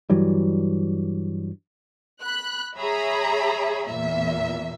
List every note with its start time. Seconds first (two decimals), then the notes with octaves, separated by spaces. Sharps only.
0.10 G2 E3 F#3 G3
2.23 B5 F#6
2.78 G#4 C#5 E5 A#5 B5
3.88 E2 A#2 E5